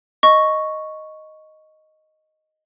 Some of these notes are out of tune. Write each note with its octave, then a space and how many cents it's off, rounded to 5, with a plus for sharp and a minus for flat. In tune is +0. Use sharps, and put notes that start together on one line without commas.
D#5 +0 C#6 +0